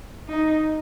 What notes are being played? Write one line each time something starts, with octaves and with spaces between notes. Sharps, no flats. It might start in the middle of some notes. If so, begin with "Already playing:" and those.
D#4